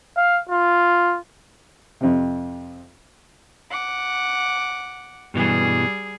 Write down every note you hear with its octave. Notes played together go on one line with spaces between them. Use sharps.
F5
F4
F2 C3
F#5 D6
G2 B2 E3 G3 G#4